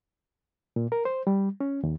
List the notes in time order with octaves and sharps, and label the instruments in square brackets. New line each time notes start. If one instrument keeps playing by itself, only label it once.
[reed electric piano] A#2
A#4
C5
G3
C#4
D#2